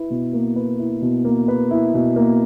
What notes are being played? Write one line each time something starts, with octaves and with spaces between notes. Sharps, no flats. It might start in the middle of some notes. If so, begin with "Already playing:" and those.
Already playing: E4 B4
B2
A#3
B4
E4
B2
A#3
B4
E4
B2
A#3